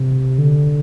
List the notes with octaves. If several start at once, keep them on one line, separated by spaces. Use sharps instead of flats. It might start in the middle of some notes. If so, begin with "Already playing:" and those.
Already playing: C3
D3